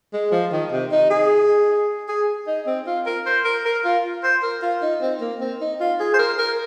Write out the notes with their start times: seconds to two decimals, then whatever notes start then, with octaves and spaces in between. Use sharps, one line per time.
0.13 G#3
0.32 F3
0.52 D#3
0.72 C3
0.92 D#4
1.10 G#4
2.08 G#4
2.47 D#4
2.67 C4
2.87 F4
3.06 A#4
3.26 C5
3.45 A#4
3.65 A#4
3.84 F4
4.23 C5
4.43 A#4
4.62 F4
4.82 D#4
5.02 C4
5.21 A#3
5.41 C4
5.61 D#4
5.80 F4
6.00 G#4
6.14 C5
6.19 A#4
6.38 A#4